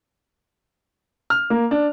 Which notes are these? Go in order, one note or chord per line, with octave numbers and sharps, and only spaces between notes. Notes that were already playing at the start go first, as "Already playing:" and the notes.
F6
A#3
D4